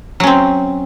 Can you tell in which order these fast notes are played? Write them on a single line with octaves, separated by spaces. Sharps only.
F#3 C#4 C4